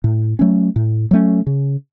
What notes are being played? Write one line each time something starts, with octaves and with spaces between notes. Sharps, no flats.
A2
F#3 A3 C#4
A2
F#3 A3 C#4
C#3